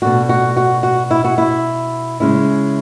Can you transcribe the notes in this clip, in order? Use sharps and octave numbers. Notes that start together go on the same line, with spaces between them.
B2 A3 D4 F#4
F#4
F#4
F#4
E4
F#4
E4
C#3 G#3 C#4 E4